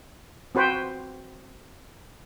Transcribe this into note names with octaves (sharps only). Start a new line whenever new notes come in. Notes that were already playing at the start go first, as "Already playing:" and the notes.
C4 F#4 B4 C5 G5